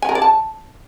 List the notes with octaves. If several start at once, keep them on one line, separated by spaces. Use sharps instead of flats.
G#5
A#4
D5
A5